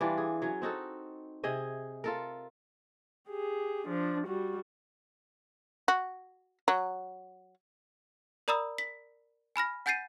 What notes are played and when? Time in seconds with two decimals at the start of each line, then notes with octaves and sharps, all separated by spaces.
0.01 E3 G3 D4 F4
0.17 G#4
0.42 F#3 C#4
0.62 C4 D#4 F#4 A4
1.43 C3 G#4 D#5 E5
2.04 F4 A4 A#4
3.29 G4 G#4
3.87 F3 D4
4.27 G3 F#4
5.88 F#4
6.68 F#3
8.48 A#4 D5 A#5 B5 D#6 E6
8.78 B6
9.56 G#5 B5 F6 A#6
9.86 F#5 G#5 G6 A6 C7 D#7